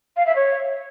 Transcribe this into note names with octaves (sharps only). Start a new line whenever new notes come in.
F5
E5
C#5